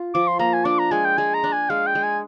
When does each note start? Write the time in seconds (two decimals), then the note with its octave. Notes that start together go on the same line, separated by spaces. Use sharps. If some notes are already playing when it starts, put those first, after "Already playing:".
Already playing: F4
0.14 F3 D6
0.27 C6
0.39 A#3 A#5
0.53 G#5
0.65 D4 D6
0.79 A#5
0.91 G#3 G#5
1.05 G5
1.17 G#3 G#5
1.34 A#5
1.44 D4
1.53 G#5
1.69 G#3 F5
1.87 G5
1.95 G#3
2.03 G#5